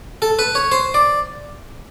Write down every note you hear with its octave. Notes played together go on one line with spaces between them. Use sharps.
A4
B4
C#5
C5
D5